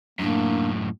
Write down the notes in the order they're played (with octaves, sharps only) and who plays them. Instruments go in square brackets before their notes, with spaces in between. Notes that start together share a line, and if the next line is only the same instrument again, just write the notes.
[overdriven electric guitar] F#2 A2 [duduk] A#3 [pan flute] D4